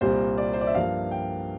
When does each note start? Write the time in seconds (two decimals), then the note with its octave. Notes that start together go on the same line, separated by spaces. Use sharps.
0.01 C2 A#2 G3 C4 C5
0.38 D5
0.53 C5
0.61 D5
0.67 E5
0.75 G2 F3 A#3 F5
1.11 G5